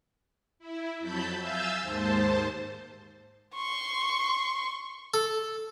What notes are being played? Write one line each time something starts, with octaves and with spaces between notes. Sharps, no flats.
E4
F2 F#3 A5 B5 G6
E5 F5 G#5 E6 G6 A6
D#2 G#2 C5 A5
C6 C#6
A4